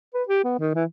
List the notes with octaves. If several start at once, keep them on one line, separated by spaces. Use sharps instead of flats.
B4
G4
B3
D#3
E3